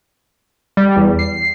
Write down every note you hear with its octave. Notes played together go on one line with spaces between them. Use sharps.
G3
E2
C7